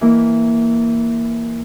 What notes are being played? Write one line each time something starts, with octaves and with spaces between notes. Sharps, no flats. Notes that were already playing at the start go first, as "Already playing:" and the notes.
E3 A#3 E4